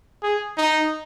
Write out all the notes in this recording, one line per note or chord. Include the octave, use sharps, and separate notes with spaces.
G#4
D#4